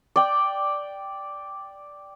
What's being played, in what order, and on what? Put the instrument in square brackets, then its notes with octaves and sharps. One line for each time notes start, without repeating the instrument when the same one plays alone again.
[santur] D5 G5